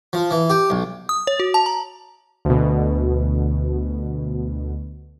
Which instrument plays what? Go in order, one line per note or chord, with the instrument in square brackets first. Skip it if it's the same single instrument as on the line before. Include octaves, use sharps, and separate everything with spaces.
[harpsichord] F3
E3
G4
B1
[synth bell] D#6
C#5
F#4
A5
A#5
[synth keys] D2 B2